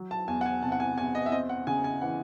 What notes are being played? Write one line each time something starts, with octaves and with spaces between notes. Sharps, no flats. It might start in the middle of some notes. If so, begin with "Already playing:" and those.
Already playing: F#3
A5
E2 G#5
F#5
G#5
C3 A5
F#5
G#5
E2 G#5
D#5
E5
C4 D#5
F#5
C#3 G#5
G#5
E3 F#5